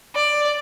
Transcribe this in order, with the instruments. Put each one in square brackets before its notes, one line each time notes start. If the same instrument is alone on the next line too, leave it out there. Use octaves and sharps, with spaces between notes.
[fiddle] D5